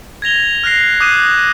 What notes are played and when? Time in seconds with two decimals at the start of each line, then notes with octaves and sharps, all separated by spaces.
0.22 G#6 A#6 F7 G7
0.64 F6 F#6 A#6 C7
1.00 D6 D#6 F#6 G6 D#7 E7